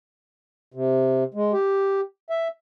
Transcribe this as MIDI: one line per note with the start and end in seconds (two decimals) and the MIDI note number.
0.74 1.24 48
1.34 1.52 56
1.53 2.01 67
2.30 2.48 76